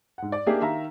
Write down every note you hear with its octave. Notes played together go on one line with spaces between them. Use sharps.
G#2 F#5
D5
A#3 D4 D#4 G4 G#4 E5
D#3 E5 F5 A#5